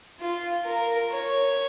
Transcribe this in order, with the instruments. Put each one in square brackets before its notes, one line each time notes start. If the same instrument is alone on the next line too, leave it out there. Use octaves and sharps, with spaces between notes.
[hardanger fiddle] F4
A#4
C#5